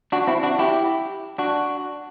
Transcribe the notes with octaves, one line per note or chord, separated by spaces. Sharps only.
D4 F#4
C4 E4
D4 F#4
E4 G4
D4 F#4